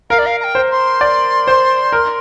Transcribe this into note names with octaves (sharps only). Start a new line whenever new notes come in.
A#4 F5
D5
F5
A#5
G5
C5
C6
D5
C5
A#4